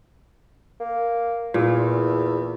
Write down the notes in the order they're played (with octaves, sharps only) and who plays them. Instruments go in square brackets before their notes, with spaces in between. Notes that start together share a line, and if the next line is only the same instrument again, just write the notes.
[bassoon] A#3
[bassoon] E2 [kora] A#2